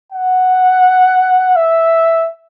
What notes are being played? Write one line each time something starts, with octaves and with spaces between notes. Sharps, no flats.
F#5
E5